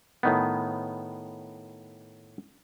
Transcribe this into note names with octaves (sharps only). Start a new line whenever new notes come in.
A2 D#3 B3